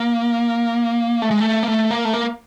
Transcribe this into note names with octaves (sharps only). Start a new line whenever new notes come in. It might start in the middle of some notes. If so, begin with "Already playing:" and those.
Already playing: A#3
A3
G#3
A3
A#3
A3
A#3
A3
A#3